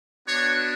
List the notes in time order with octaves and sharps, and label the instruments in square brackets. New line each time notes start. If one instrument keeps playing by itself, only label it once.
[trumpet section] B3 D4 F#4 C#5